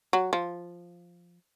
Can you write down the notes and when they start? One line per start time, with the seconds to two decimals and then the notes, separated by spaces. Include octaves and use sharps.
0.13 F#3
0.33 F3